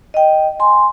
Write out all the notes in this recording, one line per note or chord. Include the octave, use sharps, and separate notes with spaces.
D#5 G5
G#5 C6